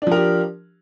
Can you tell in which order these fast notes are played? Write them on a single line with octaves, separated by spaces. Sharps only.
D4 F3 A#4 G4